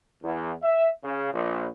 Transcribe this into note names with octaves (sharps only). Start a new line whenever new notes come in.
E2
E5
C#3
A#1